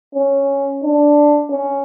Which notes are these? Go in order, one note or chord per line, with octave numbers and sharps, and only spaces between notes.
C#4
D4
C#4